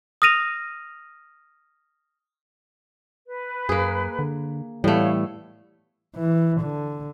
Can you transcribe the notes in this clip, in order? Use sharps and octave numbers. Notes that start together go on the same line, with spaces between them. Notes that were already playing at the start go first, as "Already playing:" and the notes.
D#6 F6 A#6 D#7 F7
B4
F#2 A#3 G#4
D3
A2 E3 G3 A3 B3 C#5 F5
E3
D3